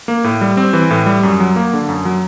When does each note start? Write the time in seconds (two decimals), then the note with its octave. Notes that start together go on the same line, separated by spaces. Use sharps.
0.08 A#3
0.24 A2
0.41 G3
0.57 C4
0.73 E3
0.90 A2
1.06 G3
1.23 F#2
1.40 F#3
1.56 A#3
1.73 D3
1.89 F#2
2.05 F#3